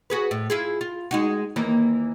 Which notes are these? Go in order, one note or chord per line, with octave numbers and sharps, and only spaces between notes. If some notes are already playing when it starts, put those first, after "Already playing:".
F#4 G#4 B4
A2
E4 F4 G#4
F4
G#3 D#4 F#4
D#2 E3 A#3